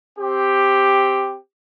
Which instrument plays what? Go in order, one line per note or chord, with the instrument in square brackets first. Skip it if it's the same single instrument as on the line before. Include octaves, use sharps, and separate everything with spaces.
[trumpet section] C4 G4